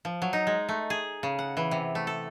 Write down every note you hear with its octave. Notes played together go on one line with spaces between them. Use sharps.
F3
F#3
D#4
G#3
A3
G#4
C#3
F#5
E3
C3
A3
A4